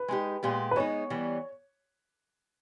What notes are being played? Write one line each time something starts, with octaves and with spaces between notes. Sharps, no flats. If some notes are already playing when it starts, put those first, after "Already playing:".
Already playing: B4
G#3 D#4 G4
A#2 G#3 B3 G4
B4
G#3 B3 D#4 C#5
E3 G3 B3